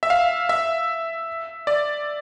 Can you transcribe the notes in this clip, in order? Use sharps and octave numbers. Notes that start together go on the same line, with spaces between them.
E5
F5
E5
D5